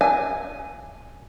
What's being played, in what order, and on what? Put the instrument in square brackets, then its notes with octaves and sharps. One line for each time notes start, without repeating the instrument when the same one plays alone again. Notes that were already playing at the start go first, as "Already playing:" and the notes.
[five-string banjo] G#5